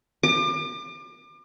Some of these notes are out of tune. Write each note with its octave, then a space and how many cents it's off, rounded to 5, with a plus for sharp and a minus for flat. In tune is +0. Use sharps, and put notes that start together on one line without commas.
D6 +35